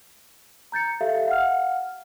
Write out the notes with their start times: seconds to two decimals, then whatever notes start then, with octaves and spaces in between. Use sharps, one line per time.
0.72 A#5 G6 A6 C#7
1.01 G4 A4 E5 F5
1.27 F5 F#5 F6